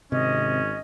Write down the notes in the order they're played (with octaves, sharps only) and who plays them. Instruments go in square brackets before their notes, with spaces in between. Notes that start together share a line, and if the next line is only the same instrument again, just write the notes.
[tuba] G#1 [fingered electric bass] C3 [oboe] C#4 [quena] D#5